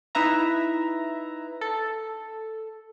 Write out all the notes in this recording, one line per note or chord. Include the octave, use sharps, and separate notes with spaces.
D#4 E4 B4 E5 A#5
A4